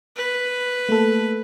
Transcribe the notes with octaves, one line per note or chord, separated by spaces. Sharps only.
B4
A3 A#3 A4